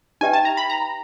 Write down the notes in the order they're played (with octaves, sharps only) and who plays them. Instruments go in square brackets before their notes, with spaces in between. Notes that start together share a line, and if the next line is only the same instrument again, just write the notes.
[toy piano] D#4 G4 B4 E5 G5 [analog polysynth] G#5
[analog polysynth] A5
A#5
B5
A#5